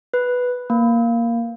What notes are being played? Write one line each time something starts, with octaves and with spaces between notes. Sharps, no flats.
B4
A#3